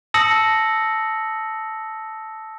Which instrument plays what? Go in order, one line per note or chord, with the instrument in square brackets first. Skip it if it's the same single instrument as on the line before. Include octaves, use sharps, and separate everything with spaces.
[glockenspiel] A5 D#6 E6 A#6 C#7 F#7